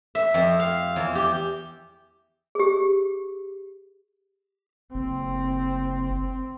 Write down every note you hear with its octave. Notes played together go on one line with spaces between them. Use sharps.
E5
F2
F5
E2
G4
G4 G#4
F#1 C4